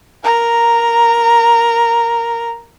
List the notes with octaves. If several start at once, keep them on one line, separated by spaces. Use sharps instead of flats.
A#4 A#5